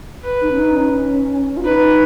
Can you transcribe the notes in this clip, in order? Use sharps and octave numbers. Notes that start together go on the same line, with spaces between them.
B4
D#4
C#4
D#4
C#4
F4
D#4 B4